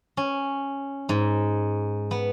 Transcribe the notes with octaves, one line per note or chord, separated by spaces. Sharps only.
C#4
G#2
B3